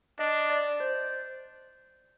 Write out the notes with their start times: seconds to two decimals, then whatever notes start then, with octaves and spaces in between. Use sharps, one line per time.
0.19 D4 D#5
0.50 D5
0.80 C5